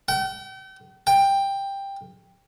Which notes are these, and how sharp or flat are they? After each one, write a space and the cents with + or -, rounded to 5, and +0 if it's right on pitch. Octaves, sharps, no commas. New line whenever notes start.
G5 -40
G5 +10